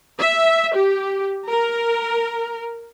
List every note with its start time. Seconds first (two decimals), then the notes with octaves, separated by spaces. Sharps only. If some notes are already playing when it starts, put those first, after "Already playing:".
0.19 E5
0.75 G4
1.48 A#4